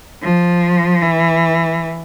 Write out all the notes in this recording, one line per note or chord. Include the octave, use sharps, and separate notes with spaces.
F3
E3